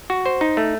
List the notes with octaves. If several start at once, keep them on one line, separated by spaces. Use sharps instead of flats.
F#4
C5
D#4
A3